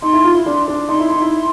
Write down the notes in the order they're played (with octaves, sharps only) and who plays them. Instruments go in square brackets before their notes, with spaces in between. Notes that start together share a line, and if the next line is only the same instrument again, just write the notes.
[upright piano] D#4 [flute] C6
[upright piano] E4
F4
E4
D4
D4
[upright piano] D#4 [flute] C6
[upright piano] E4
D#4
E4